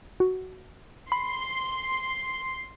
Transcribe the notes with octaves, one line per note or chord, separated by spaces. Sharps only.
F#4
B5 C6